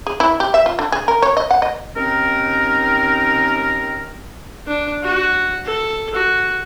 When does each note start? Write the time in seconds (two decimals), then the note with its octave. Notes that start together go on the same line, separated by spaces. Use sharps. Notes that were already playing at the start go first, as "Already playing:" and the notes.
0.07 G#4
0.20 E4
0.40 G4
0.54 E5
0.66 F4
0.79 D3
0.92 G#4
1.08 A#4
1.22 C#5
1.37 D#5
1.51 F#5
1.62 D#5
1.95 D#2 D#3 C4 C#4 A#4
4.67 D4
5.03 F#4
5.66 A4
6.15 F#4